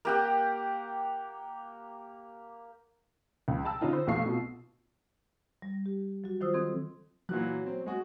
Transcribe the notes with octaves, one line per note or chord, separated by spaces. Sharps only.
A#3 G4 F#5
C#2
G5 A5 A#5 E6
D3 C#4 D#4 F4
C5
F1 B1 A3 F5 C#6 C7
B2 F4
G3
G4
F#3 G3 F#4
D#3 F#3 F4 C5 D#6 E6
D#3 C4 A4 D#6 G#6
A#2 E3 F#3 F#6
C4
G#3 F#4